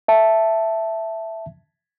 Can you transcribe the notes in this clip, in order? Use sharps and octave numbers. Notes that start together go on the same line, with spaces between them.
E5 A5